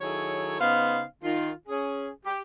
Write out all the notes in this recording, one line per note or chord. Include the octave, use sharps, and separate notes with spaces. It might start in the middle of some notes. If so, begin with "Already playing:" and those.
D#3 F#3 E4 G#4 A4 C#5
C#3 B3 D#4 C5 F5
D#3 F4
C#4 G#4
G4